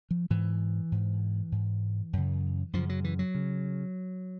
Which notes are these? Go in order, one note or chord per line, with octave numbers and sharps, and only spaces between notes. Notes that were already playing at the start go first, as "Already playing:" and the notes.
F3
G#2 E3
G#2
G#2
F#2 C#3
F#2 C#3 F3
F#3
E3
F#3
C#3